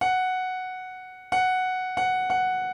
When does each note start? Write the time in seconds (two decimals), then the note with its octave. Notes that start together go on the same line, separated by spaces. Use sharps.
0.01 F#5
1.32 F#5
1.97 F#5
2.30 F#5